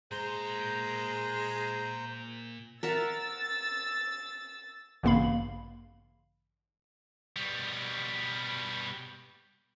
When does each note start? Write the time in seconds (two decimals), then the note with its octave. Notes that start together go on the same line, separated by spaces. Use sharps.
0.11 A#2 G#3 C5 A#5 C6 G6
2.83 A#4 E5 F#5 E6 A6
5.03 A1 G2 C#3 A#3 F5 B5
7.36 B2 G3